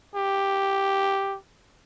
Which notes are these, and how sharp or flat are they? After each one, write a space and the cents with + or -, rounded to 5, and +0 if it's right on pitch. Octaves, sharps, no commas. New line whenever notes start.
G4 +0